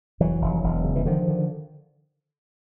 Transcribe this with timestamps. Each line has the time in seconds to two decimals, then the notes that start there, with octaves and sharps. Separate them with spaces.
0.20 F1 E3 F#3
0.42 F1
0.63 E1
0.84 C#3
0.96 E3
1.06 D3 D#3 F3
1.28 D3